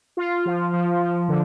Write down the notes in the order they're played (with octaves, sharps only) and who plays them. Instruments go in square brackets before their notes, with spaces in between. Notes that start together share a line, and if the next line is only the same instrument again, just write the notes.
[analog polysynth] F4
F3
F3
F3
D3